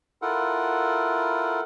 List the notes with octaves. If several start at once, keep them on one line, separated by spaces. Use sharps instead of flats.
E4 F4 A4 A#4 F#5